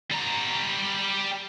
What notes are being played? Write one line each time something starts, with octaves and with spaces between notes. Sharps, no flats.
G3 A#5